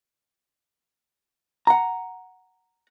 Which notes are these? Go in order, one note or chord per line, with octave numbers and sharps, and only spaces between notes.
F#5 A#5